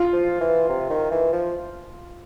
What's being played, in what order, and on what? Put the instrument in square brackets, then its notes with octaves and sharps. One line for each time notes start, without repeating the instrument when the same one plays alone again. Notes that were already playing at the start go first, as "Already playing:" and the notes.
Already playing: [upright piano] F4
[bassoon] F3
E3
C3
D#3
E3
F3